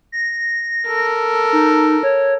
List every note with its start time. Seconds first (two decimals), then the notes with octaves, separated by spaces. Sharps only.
0.12 A#6
0.87 A4 A#4
1.53 D#4
2.03 C#5